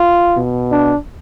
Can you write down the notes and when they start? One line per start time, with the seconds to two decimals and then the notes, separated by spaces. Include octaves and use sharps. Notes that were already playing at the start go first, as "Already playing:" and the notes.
Already playing: F4
0.36 B2
0.71 D4